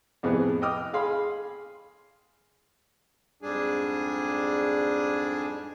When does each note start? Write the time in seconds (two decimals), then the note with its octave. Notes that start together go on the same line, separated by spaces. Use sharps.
0.23 F2 A2 C3 B3 G#4
0.62 D#5 G5 D6 D#6 F6
0.93 G#4 F5 B5 C6
3.42 F2 G#2 G3 D4 G#4 G#5